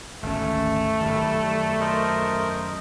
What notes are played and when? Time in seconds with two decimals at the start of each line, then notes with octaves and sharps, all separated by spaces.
0.23 G#1 D2 A3 C#4
1.01 F#2 D#3 G3
1.80 A#4 C5 D#5